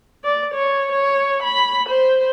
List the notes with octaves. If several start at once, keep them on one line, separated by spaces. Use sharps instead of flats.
D5
C#5
C#5
B5
C5